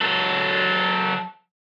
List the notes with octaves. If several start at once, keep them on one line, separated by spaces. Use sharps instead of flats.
F#3 A4